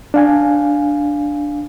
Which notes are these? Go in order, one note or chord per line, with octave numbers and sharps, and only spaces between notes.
D4 F5 G#5